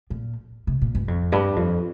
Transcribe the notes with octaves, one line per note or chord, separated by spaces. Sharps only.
A#2
C3
A#2
G2
F2
G2
F2